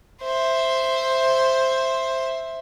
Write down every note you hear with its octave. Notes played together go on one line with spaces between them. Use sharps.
C5 E5